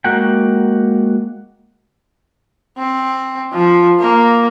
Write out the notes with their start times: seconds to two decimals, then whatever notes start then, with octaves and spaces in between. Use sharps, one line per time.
0.04 G#3 A#3 F#4 F#5 G5
2.78 C4
3.53 F3
4.00 A#3